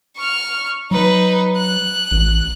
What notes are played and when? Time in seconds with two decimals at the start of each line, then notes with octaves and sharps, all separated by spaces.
0.17 C#6 F6
0.91 F#3 D#4 B4
1.57 F#6
2.12 A1